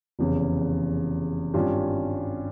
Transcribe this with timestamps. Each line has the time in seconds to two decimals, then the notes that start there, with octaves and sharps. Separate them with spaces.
0.19 F1 E2 C#3
1.54 G#1 G2 G3 C#4 F4